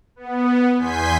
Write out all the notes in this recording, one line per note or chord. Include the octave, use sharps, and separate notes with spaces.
B3
E2 G#5 C6 G6 B6